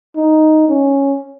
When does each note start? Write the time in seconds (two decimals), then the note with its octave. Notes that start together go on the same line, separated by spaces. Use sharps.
0.16 D#4
0.69 C#4